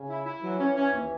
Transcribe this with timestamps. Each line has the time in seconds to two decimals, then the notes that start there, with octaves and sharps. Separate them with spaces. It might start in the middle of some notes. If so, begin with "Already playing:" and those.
Already playing: C#3
0.08 E4
0.26 E4
0.42 E3 F#3
0.59 C#4
0.76 C#4
0.93 D#2